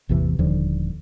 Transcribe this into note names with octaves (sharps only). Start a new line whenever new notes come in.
A1 E2 C3 E3
D#1 D#2 D3 F3